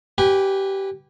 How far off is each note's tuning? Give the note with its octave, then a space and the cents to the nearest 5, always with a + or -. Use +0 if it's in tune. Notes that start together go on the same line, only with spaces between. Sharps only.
G4 -15 B4 +0 G#5 -30